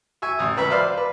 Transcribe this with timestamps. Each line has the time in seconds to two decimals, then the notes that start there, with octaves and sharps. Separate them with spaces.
0.22 E5 G#5 C#6 E6
0.39 A1 D#6
0.57 C#2 B4 E5 B5
0.70 B4 C5 D5 F5
0.83 D5
0.97 B4